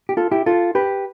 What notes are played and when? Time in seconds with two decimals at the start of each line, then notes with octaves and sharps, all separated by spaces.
0.09 G4
0.17 F4 A4
0.31 E4 G4
0.46 F4 A4
0.75 G4 B4